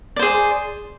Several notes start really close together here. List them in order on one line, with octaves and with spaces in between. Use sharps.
D5 C5 G#4